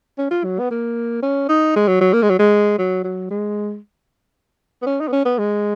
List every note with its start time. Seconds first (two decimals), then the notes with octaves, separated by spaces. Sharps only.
0.18 C#4
0.31 F4
0.45 F#3
0.60 B3
0.71 A#3
1.23 C#4
1.49 D#4
1.76 G#3
1.88 F#3
2.01 F#3
2.13 A#3
2.22 G#3
2.30 F#3
2.39 G#3
2.79 F#3
3.04 F#3
3.31 G#3
4.82 B3
4.87 C#4
5.01 D#4
5.08 B3
5.13 C#4
5.25 B3
5.39 G#3